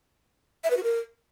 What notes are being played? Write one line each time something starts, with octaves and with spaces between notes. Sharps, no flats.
E5
B4
F#4
A#4